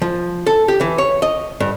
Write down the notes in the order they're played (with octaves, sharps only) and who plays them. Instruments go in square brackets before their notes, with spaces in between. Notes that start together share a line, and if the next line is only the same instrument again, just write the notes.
[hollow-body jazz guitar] F3
A4
G4
E3
C#5
D#5
G2